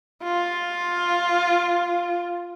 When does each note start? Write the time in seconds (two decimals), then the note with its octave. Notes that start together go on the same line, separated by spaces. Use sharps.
0.23 F4